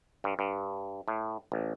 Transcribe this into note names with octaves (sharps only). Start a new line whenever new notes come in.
G2
G2
A2
A1